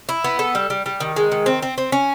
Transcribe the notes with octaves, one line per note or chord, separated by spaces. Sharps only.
E4
B3
A4
G3
G3
G3
D#3
G#3
D#3
C4
C4
C4
C#4